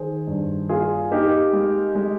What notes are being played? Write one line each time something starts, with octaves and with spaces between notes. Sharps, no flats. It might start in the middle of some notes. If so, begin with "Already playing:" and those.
Already playing: D#3 G#4 C5
G2
A#3 F4 G#4
A#3 D#4 G4
G#3
G#3